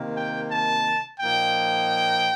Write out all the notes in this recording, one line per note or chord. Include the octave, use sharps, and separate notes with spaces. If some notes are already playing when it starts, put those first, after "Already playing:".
Already playing: C3 D#3 A#3
G5
A5
A#2 F3 A#3 D#4 G5